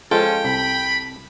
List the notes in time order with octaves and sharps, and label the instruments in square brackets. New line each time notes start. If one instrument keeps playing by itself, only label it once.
[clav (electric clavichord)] F3 G#3 F4 [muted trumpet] C#4 [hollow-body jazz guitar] A4 [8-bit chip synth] G5
[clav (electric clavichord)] C2 [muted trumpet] B5